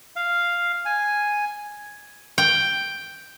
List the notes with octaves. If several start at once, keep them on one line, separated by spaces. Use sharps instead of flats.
F5
G#5
G5